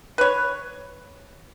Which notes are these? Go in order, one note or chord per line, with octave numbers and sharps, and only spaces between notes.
B4 C#5